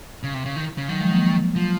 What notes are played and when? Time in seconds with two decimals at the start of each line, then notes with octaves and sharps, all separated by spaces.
0.23 C#3
0.34 C3
0.46 C#3
0.56 D#3
0.78 C#3
0.89 D#3 F#3
1.00 F3 G#3
1.11 F#3 A#3
1.55 F3 F#3